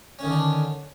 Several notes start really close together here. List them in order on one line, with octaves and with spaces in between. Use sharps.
C#4 D#3 D3 D4